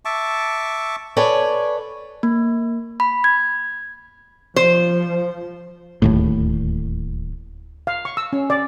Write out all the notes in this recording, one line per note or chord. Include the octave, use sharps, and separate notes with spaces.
E5 A5 C#6 D6
A4 B4 C#5 D5 G#5
A#3
B5
G#6
F3 C5
D1 D#2 A2
F5
C#6
E6
C#4
D5